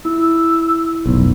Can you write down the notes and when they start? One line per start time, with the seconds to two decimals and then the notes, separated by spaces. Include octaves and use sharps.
0.05 E4 E6
1.06 F1 B1